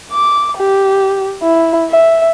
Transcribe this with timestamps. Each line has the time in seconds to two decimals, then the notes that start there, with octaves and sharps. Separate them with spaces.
0.11 D6
0.57 G4
1.42 E4
1.90 E5